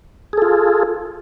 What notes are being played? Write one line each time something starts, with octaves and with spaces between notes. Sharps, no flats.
F4 G#4 A4